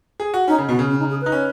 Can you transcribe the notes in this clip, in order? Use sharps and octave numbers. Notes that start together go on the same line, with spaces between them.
G#4
F#4
C#4 D#4
C#3
B2 F#4
C#3
C#4
D#4
G#4
D#4 B4
C#4